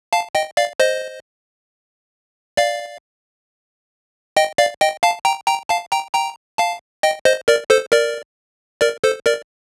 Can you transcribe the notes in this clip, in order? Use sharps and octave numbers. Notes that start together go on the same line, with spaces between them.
F5 A5
D#5 G5
D5 F5
C5 D#5
D5 F5
D#5 G5
D5 F5
D#5 G5
F5 A5
G5 A#5
G5 A#5
F5 A5
G5 A#5
G5 A#5
F5 A5
D#5 G5
C5 D#5
A#4 D5
A4 C5
A#4 D5
A#4 D5
A4 C5
A#4 D5